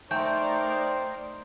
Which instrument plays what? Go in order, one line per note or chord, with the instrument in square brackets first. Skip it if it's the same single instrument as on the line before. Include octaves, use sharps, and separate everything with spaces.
[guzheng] A3 [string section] D#4 A#4 D5 [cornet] C5 [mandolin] G5